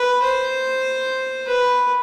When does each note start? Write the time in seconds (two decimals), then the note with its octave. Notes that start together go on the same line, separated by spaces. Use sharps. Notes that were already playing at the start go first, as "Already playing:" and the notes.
Already playing: B4
0.23 C5
1.46 B4